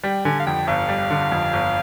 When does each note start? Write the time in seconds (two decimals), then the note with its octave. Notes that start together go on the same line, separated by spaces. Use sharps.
0.03 G3 G5
0.25 D3 G#5
0.39 F5
0.46 F2 G5
0.67 G1 F5
0.89 G3
1.11 D3
1.32 F2
1.53 G1